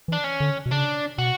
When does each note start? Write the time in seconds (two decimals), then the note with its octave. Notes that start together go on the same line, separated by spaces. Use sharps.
0.08 E3 D4
0.24 C#4
0.40 D3
0.66 B2
0.71 C#3 D4
1.18 B2 F#4